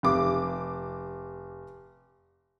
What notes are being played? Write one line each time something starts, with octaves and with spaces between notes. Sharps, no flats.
F1 D6